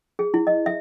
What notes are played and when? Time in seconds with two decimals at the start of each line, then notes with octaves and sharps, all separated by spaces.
0.19 G#4
0.34 E4
0.47 D#5
0.66 E5